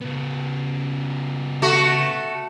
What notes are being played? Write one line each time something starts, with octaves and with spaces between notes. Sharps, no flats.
C#3 B3
A3 F#4